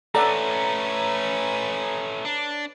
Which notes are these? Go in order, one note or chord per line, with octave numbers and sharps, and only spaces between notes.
A3 C#4 A4 B4 C#5 D5 F#5 A#5
D4